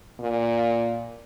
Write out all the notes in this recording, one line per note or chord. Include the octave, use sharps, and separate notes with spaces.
A#2